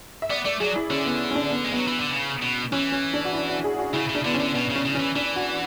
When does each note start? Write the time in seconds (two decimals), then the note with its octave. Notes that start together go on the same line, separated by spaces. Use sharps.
0.22 E5
0.30 B3 D5
0.45 A3 D5
0.60 F#3 G#4
0.76 E4
0.90 D3 C#4
1.06 B3
1.31 C#4
1.35 D4
1.51 B3
1.65 G#3
1.72 F#3 B3
1.87 E3
2.00 D3
2.11 C#3
2.42 B2
2.72 E3 C#4
2.92 C#4
3.14 D4
3.25 F#4
3.33 E4
3.49 F#4
3.64 G#4
3.79 F#4
3.93 C#3 E4
4.09 C#3
4.15 D4
4.25 D3 B3
4.34 C#4
4.40 D3
4.54 B2 B3
4.70 C#3
4.76 C#4
4.85 C#3
4.95 E3 C#4
5.15 E3 D4
5.36 F#4